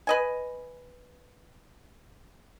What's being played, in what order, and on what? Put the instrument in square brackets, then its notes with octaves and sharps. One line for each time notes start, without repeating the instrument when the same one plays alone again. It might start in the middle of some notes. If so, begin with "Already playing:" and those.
[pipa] B4 D#5 G#5